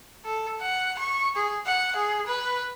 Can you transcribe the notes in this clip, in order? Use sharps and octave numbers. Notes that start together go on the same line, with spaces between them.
A4
F#5
C#6
G#4
F#5
G#4
B4